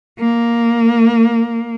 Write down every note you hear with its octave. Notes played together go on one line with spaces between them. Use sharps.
A#3